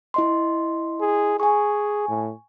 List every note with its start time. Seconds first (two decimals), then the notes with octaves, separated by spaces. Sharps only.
0.14 E4 D#5 C6
1.01 G#4
1.40 G#4 G#5 C#6
2.09 A2